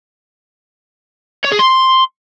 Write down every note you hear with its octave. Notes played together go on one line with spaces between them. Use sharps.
C#5
G#4
C6